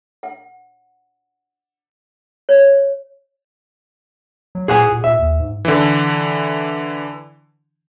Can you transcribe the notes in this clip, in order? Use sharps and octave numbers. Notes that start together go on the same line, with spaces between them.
F#5
C#5
F#3
A#2 G#4 F#5 G#5
A#2
A#2 E5
D#2
G#2
D3 E3